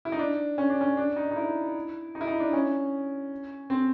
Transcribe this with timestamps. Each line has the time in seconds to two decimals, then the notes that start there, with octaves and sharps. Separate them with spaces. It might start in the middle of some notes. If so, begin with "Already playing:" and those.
0.05 E4
0.12 D#4
0.19 D4
0.58 C#4
0.70 D4
0.81 C#4
0.97 D4
1.16 D#4
1.31 D#4
1.36 E4
2.15 D#4
2.21 E4
2.27 D#4
2.40 D4
2.53 C#4
3.70 C4